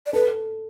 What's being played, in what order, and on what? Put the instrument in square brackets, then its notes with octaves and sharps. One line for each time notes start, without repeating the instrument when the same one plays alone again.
[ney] D5
[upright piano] A4 [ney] B4